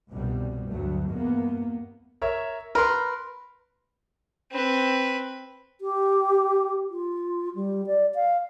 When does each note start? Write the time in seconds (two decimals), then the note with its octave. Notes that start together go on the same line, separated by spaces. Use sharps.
0.11 G1 C2 B2 G3
0.71 D2 G2 F#3 A3
1.12 E2 G2 A#3 B3
2.22 A#4 C#5 E5
2.75 A#4 B4 B5 C6
4.51 C4 B4
5.81 G4
6.90 F4
7.55 G3
7.87 D5
8.15 F5